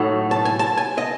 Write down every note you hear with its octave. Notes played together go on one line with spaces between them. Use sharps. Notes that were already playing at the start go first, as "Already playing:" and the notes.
Already playing: A2 F#3 A3 D#4
A5
G#5
A5
G#5
D#5